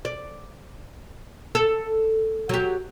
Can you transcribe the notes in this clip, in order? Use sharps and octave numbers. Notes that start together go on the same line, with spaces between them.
D5
A4
F#3 G4